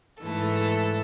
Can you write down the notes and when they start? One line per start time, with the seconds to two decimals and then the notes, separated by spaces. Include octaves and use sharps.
0.20 G#2 E3 A3 A4